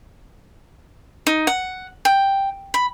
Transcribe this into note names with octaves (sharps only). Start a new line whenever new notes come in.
D#4
F#5
G5
B5